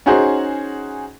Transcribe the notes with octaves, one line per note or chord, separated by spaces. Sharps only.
C#4 D#4 F#4 G#4 C5